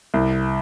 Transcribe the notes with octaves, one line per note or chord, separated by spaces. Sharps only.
C2